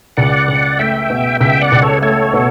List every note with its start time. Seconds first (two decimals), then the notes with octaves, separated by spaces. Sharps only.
0.17 C#2 D5 F#5
0.48 C#2
0.79 A3 E5 G5
1.10 B2
1.41 C#2 E5 G5
1.61 D5 F#5
1.72 C#2
1.82 A4 C#5
2.02 A3 A4 C#5
2.33 B2